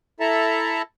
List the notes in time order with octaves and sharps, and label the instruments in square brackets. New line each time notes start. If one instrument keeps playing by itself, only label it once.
[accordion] E4 A4 E5 A5 A#5